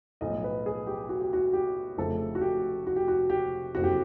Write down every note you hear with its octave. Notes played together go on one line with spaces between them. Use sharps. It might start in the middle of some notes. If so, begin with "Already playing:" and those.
B1 A2 F3 D#5
B4
G#4
G4
F#4
G4
F#4
G4
F1 F2 C#3 F3 A3 A4
F#4
G4
F#4
G4
F#4
G4
F#1 F2 C3 F#4
G4